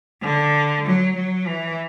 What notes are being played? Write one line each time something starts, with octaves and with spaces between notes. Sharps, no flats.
D3
F#3
F#3
E3